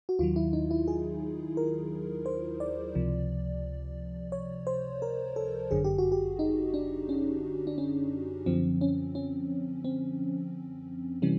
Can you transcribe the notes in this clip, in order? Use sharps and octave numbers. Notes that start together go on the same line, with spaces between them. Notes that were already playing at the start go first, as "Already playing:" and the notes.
F#4
D#2 D#3 F#3 F4
E4
D#4
E4
G#4
A#4
C5
D5
C#2 C3 F3
C#5
C5
A#4
A4
G1 F#2 D3 G#4
G4
F#4
G4
D#4
D4
C#4
D4
C#4
F#2 D3 F3 C4
C#4
C#4
C4
C3 E3 G3 C#4